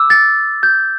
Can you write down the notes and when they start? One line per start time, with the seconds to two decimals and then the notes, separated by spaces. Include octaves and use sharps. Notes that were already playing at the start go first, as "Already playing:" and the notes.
Already playing: D6 E6
0.10 A6
0.63 G6